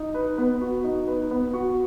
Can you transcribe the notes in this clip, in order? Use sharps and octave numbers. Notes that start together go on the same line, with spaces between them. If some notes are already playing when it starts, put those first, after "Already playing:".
Already playing: D#4
B4
B3
F#4
D#4
B4
B3
F#4